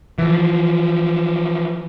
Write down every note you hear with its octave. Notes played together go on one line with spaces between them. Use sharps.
E3 F3